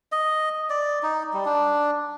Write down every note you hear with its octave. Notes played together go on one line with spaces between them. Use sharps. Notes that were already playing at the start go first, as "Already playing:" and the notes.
D#5
D5
D#4
G3
D4